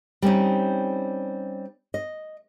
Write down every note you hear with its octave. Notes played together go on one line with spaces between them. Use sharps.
G3 C4 C#4 D#4
D#5